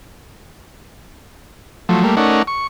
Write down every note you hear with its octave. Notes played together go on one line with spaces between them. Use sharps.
F3 F#3 A3
G3 A3 A#3
A3 C#4 D#4 A#4 D5 F#5
C#6